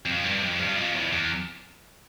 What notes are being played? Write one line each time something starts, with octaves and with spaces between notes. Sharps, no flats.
F2
G2
F2
G2
F2
E2
E2